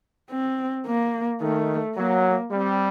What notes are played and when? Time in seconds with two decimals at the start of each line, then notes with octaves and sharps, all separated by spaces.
0.31 C4
0.86 A#3
1.41 D#3 A3
1.96 F#3 A#3
2.52 G3 C4